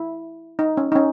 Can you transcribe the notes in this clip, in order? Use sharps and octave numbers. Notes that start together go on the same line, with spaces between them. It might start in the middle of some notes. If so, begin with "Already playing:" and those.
Already playing: E4
D#4
C#4
D#4
C#4